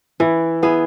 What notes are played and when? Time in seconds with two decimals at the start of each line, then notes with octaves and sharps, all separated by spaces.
0.20 E3 E4
0.63 B3 E4 G#4